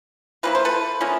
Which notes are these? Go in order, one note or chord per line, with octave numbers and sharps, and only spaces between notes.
F3 A#3 C#4 E4 B4
C5
A4 B4
F3 A#3 C#4 E4